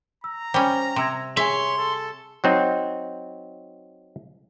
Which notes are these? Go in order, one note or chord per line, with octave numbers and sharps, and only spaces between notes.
A#5 E6
G3 C#4 C5 G5
C3 C6 E6 G#6
G#4 C#5 E5 G#5 C6
A4
F#3 C4 D#4